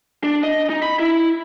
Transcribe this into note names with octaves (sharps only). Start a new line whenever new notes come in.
D4
D#5
D#4
B5
E4